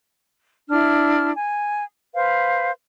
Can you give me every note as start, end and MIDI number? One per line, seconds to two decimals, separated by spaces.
0.70 1.31 62
0.70 1.31 64
0.70 1.31 89
1.36 1.84 80
2.14 2.70 71
2.14 2.70 72
2.14 2.70 77